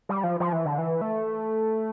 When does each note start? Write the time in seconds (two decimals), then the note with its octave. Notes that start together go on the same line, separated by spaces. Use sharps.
0.09 G3
0.24 F3
0.40 F3
0.53 E3
0.65 D3
0.78 E3
1.01 A3